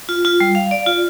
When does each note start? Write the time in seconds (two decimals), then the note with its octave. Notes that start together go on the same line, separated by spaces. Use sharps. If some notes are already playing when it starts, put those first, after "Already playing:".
0.09 F4
0.25 F4
0.40 G3
0.55 F5
0.71 D5
0.86 F4